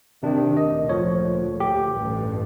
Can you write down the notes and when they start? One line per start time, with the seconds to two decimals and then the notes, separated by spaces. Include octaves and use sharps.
0.23 C3 D#3 D4
0.57 D2 A#2 D#5
0.89 F3 C#5
1.60 G4
1.92 A1 G2